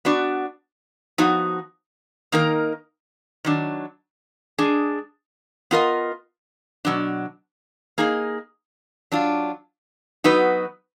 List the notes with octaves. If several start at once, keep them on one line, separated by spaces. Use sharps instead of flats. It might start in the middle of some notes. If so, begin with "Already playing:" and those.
B3 D4 F#4 D5
F3 B3 D#4 F#4
D#3 A#3 D#4 A#4
D#3 F#3 D4
G#3 D4 G#4
B3 F4 A#4 D#5
B2 F#3 D4
A#3 D#4 G#4 D#5
F#3 D4 F4
F#3 B3 D#4 F#4 B4